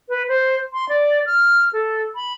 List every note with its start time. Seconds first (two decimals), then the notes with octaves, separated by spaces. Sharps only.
0.09 B4
0.28 C5
0.73 C6
0.89 D5
1.26 F6
1.73 A4
2.15 B5